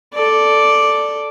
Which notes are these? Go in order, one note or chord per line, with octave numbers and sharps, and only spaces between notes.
A4 D5